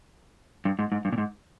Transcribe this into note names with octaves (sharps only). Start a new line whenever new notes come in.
G2
G#2
G#2
G2
A#2
G#2